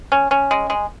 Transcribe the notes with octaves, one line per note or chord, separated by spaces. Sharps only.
C#4
C#4
G#3
G#3